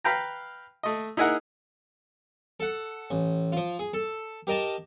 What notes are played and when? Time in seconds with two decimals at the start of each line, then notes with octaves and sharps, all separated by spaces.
0.04 B4 F5 G5 A#5
0.83 A3 D#5
1.17 D#4 E4 G#4 A#4 F#5
2.60 A4 F#5
3.11 A1
3.52 F3 F4
3.79 G#4
3.94 A4
4.47 G4 A#4 D#5 A5